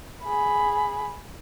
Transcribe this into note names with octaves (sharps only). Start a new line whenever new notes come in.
G#4 B5